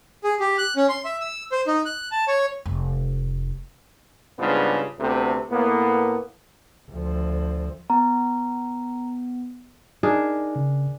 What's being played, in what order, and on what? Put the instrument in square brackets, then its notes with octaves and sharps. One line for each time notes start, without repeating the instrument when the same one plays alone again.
[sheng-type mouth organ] G#4
G4
F#6
C#4
C6
E5
E6
C5
D#4
F#6
A5
C#5
[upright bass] F1
[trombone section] G#2 C#3 G3 B3 D4 F4
D2 C3 A3 B3 C4
A2 A#3 B3
[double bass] D2 F3
[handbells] B3 [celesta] A#5
[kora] D4 G#4 A#4 [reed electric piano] D#4
[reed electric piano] C#3